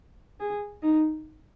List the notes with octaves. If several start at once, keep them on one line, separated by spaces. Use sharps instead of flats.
G#4
D#4